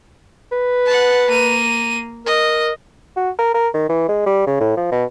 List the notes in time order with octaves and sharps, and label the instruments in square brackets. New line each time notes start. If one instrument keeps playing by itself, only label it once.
[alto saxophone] B4
[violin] F#5 A5
A#3 D#7
[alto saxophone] A#4 [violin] D#5
[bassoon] F#4
A#4
A#4
D#3
E3
G#3
G3
C#3
A2
F3
B2